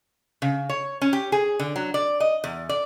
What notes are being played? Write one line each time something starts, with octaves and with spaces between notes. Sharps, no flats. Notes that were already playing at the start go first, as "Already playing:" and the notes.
C#3
C#5
C#4
G4
G#4
D3
F#3
D5
D#5
E2
D5